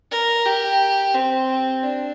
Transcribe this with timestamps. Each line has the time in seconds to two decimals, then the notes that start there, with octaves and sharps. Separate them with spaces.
0.11 A#4
0.46 G4
1.15 C4
1.84 D4